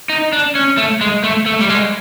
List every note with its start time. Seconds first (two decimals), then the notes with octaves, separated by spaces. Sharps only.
0.09 D#4
0.33 D4
0.55 C#4
0.78 A3
1.01 G#3
1.24 A3
1.46 A3
1.61 G3
1.69 G#3